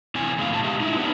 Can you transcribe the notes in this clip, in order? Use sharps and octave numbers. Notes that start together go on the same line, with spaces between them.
C3 E3 C4 G#5
A2 C#3 G#3 B3 C#5 F5
G#2 B2 A5
G#3 G4 E5
D#4 E4
B3 D4